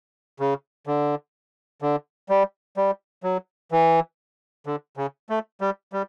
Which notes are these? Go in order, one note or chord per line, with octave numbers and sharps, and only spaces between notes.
C#3
D3
D3
G3
G3
F#3
E3
D3
C#3
A3
G3
G3